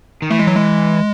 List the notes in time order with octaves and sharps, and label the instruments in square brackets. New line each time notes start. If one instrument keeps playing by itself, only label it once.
[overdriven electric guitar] D#3
[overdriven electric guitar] E3 [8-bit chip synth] A3
[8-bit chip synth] G#3
F#3
G#3